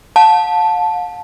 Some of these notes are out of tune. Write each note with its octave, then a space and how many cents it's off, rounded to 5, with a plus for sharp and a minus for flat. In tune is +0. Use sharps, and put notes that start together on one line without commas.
F5 +45 A5 -5